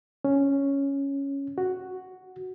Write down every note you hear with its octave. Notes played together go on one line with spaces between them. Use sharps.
C#4
F#4